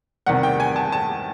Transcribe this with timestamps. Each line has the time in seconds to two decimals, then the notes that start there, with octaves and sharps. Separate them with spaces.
0.26 E2 C3 D#3 G3 F#5
0.43 G5
0.60 G#5
0.76 A5
0.92 A5